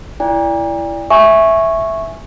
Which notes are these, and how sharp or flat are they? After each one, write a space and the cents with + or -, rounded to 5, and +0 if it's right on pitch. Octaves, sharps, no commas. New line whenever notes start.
E4 +15 D5 -10 G5 +40
E5 +0 G#5 +0 C#6 -10